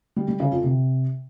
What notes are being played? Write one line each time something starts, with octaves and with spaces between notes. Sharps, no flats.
G3
G3
C#3
F2
C3